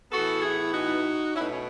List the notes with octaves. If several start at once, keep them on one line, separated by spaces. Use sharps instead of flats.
A2 E3 B3 F#4 A4
E4 G#4
D#4 F#4
B2 A3 C#4 D#4 E4
C#4